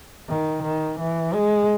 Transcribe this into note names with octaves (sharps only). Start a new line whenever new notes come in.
D#3
D#3
E3
G#3